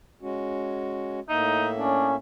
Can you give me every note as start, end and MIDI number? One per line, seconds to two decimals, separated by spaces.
0.21 1.20 56
0.21 1.20 61
0.21 1.20 66
1.29 2.16 45
1.29 2.16 58
1.29 1.67 63
1.29 2.16 76
1.79 2.15 61
1.79 2.09 62